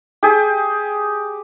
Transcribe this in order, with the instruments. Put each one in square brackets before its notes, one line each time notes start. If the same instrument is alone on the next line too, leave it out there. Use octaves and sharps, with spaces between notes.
[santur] G4 G#4